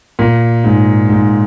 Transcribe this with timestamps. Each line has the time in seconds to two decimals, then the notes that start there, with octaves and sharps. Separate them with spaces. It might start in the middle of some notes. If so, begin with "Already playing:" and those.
0.19 A#2
0.64 G#2
1.10 G#2